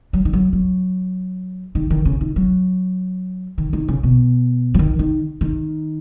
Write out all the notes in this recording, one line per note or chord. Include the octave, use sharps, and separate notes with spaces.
F#3
D#3
F#3
F#3
D#3
D#3
C#3
D#3
F#3
D#3
D#3
C#3
B2
F#3
D#3
D#3
D#3